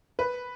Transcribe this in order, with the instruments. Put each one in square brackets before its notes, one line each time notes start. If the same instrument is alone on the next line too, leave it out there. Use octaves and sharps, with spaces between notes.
[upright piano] B4